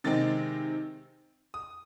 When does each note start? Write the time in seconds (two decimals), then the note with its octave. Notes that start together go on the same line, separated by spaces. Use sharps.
0.04 C3 D#3 G#3 C4 A6
1.54 D#6